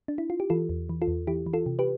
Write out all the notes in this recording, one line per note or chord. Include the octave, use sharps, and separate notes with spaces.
D4
E4
F4
G4
E3 F4 A4
E2
E3
F4 A4
E2
E3 E4 G4
E3
F4 A4
C3
G4 B4